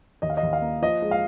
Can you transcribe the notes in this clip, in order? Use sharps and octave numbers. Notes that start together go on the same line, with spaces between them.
D#2 D#5
F5
D#5
D#2
F5
A#3
F3 D#5
G#3
F5